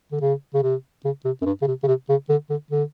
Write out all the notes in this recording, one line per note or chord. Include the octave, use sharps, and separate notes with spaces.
D3
C#3
C#3
C3
C#3
C3
F#2
G2
C#3
C3
C#3
C3
C#3
D3
D3
D3